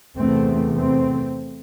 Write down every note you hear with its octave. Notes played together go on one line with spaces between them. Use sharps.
E2 C3 A3 C4
A3 C4